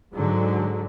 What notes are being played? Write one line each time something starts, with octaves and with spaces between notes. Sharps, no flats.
G#2 D3 F#3 G#3